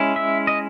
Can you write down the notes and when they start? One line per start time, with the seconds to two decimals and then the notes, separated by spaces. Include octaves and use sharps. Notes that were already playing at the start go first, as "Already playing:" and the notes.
Already playing: G#3 C#4 E4
0.16 E5
0.47 D#5